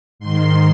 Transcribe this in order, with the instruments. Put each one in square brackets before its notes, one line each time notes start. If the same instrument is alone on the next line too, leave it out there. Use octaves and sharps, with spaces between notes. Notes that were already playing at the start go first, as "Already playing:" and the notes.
[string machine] G#2 D#3 C6